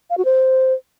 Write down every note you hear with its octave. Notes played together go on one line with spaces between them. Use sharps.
F5
F#4
C5